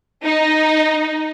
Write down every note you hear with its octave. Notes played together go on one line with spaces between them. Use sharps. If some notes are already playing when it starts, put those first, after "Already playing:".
D#4